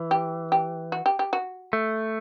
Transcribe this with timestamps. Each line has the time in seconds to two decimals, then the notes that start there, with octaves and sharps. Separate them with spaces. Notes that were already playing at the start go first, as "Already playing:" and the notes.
Already playing: E3
0.11 G4
0.52 G4
0.92 F#4
1.06 G4
1.19 G4
1.33 F#4
1.73 A3